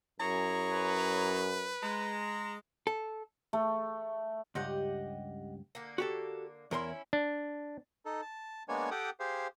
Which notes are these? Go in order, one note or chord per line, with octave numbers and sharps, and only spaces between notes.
F#2 E4 G#4 C#5 A#5
B4
G#3 A#5
A4
A3
C#2 G2 G4 D#5 F#5
D3 A#3
F#4 G4 A4
E2 C#4 D#4 E4 A#4 C6
D4
D#4 A4
A5
G#3 A#3 B3 D4 C#5 G#5
G4 A4 F#5 G5 D6 D#6
G4 G#4 C5 F5